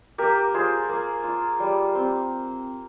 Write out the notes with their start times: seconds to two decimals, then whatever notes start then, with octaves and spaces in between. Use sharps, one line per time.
0.18 A#3 G4 A#4
0.54 F4 G#4 C5
0.89 A#3
1.24 F4
1.60 G3
1.95 C4